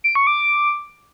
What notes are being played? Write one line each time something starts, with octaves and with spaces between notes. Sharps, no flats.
D7
C#6
D6